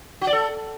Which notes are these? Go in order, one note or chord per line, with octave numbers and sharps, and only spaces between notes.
F#4
D5
A4